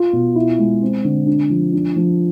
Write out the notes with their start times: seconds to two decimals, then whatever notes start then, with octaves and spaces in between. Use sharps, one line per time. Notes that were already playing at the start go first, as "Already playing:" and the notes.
Already playing: F4
0.13 B2
0.36 E4
0.58 G#3
0.82 C4
1.05 D3
1.27 D4
1.50 F3
1.73 D4
1.96 F3